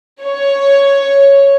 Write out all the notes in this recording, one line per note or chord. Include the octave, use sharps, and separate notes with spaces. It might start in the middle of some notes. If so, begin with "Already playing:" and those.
C#5